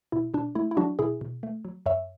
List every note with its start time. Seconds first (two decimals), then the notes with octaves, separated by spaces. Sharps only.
0.12 B2 E4
0.34 B2 D4
0.55 A3 E4
0.71 E4
0.77 F#3 D4 F#4
0.99 B2 E4 G#4
1.21 B2
1.43 A3
1.65 F#3
1.86 F#2 C#5 E5